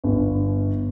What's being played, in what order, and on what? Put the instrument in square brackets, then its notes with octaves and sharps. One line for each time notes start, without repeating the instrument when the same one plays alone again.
[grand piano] G1